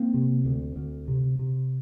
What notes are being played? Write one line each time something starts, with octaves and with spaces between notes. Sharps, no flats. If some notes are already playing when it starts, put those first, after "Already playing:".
Already playing: A#3 C4
C3
D2
D2
C3
C3